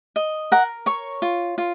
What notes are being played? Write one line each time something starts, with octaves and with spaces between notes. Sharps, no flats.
D#5
A#4 F#5
C#5 C#6
F4
F4